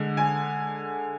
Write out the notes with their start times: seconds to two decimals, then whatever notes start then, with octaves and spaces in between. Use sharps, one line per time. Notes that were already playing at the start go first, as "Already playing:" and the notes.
Already playing: D3 G#3
0.17 G#5